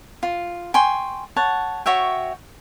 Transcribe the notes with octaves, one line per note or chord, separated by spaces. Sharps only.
F4
G5 G#5 C6 C#6
C#5 F#5 A5
F#4 C#5 E5 G5